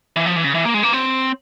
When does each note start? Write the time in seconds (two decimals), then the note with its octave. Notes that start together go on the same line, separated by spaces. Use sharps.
0.16 E3
0.26 F3
0.36 E3
0.44 C#3
0.55 E3
0.65 A#3
0.74 G#3
0.83 A#3
0.93 C4